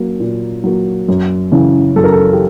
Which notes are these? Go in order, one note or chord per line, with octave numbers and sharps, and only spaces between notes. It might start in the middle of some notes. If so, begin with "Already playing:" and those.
Already playing: F#3 A#3
A#2
F#3 A#3
F#2
C#3 E3
F#2 A4
A#4
A4
G4